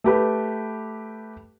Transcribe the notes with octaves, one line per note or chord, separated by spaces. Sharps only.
A3 G4 B4